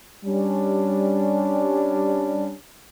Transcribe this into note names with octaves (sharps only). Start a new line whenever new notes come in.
G3 C#4 D4